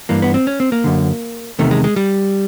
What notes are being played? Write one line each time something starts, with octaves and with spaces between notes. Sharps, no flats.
G2 E3 A#3
B3
C4
C#4
C4
A#3
F#2 D3
E2 C3 D#3 A3
G#3
G#3
G3